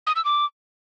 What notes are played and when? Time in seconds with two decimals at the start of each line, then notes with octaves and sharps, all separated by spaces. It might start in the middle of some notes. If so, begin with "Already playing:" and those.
0.07 D#6
0.16 E6
0.25 D6